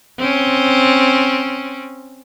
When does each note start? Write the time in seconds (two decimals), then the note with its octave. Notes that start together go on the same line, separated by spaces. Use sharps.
0.19 C4 C#4